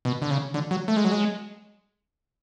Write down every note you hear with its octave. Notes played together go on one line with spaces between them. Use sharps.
B2
D3
C#3
D3
F#3
A3
G#3
F#3
G#3